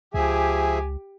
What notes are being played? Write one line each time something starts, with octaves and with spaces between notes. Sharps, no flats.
C#2 F3 G4 G#4 E5 G#5